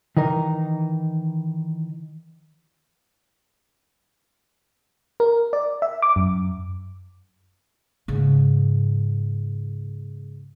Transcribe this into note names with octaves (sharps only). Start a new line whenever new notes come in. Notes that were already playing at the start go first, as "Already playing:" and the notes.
D#3 E3 D#4 A#4
A#4
D5
E5
D6
F#2
G#2 C#3